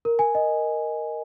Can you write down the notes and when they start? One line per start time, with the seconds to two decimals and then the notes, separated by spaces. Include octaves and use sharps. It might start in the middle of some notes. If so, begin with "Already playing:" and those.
0.05 A#4
0.19 G#5
0.35 D#5